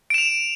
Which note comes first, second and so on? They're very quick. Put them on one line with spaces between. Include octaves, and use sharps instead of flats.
D7 E7 F7